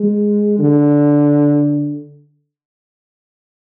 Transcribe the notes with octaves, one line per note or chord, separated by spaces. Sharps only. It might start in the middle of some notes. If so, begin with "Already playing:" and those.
Already playing: G#3
D3